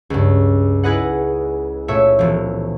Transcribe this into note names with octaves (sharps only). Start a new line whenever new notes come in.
C#2 G2
D#4 E4 G#4 B4 D#5 F#5
A#2 A3 C#5 E5
E1 F3